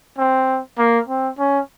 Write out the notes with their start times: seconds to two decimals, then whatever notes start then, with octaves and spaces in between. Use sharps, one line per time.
0.18 C4
0.78 A#3
1.08 C4
1.39 C#4